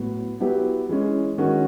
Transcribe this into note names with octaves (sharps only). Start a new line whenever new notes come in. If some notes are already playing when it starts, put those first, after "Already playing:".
Already playing: A2 F#3 B3
F#3 B3 E4 G4 B4
E3 G#3 C#4
D#3 G#3 C#4 F#4